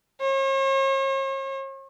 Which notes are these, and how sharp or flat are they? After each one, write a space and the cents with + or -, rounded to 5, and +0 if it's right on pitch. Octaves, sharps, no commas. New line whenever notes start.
C#5 -45